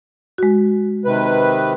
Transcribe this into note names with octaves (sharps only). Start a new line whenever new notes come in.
G#3 F#4
C3 D#3 B4